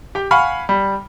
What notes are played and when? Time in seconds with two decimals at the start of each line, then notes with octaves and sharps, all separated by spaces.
0.15 G4 G5
0.31 F5 F#5 G#5 B5 C#6 F6
0.69 G3